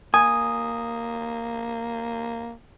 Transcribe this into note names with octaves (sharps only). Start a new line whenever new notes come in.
A#3 G#5 D#6